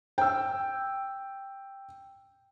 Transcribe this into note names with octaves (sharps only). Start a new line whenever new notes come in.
G5 E6